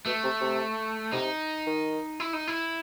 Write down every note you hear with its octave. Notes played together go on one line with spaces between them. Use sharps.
B2 A3
C3
C3
C3 D#4
D#3
E4
D#4
E4